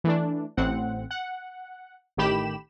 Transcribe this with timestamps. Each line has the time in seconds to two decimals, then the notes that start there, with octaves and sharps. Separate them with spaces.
0.04 E3 A3 D4
0.57 A1 A2 C4 F#5
1.11 F#5
2.17 A1 A2 D#3 G4 B5 E7